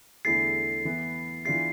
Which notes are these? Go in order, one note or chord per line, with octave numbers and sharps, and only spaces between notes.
E2 D3 A3 E4 G#4 A6 C7
E3 B3 E4
E3 B3 D4 F4 G#4 A6 C7